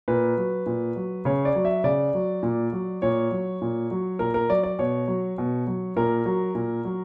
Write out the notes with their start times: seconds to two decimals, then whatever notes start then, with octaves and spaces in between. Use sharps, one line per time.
0.08 A#2 B4
0.37 F#3
0.66 A#2
0.96 F#3
1.25 C#3 C#5
1.45 D5
1.55 F#3
1.65 E5
1.84 C#3 D5
2.14 F#3
2.43 A#2
2.73 F#3
3.02 A#2 C#5
3.31 F#3
3.62 A#2
3.91 F#3
4.19 A#2 A#4
4.34 A#4
4.49 F#3 D5
4.63 D5
4.79 B2 C#5
5.08 F#3
5.38 B2
5.67 F#3
5.96 A#2 A#4
6.26 F#3
6.55 A#2
6.85 F#3